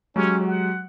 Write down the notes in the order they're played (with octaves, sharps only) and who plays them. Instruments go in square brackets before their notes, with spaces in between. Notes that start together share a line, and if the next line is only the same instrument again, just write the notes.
[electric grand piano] F#3 G#3 G4 [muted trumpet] C#4
[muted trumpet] F#5